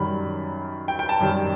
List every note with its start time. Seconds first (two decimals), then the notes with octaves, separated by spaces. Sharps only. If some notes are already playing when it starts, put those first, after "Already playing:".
Already playing: F#2 D#3 G3 B5
0.88 G5
0.99 G5
1.09 A5
1.20 F#2 D#3 G3